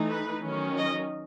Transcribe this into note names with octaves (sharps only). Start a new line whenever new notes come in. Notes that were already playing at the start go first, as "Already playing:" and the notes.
Already playing: E3 A3 D#4
B4
D#3 F#3 C#4
D#5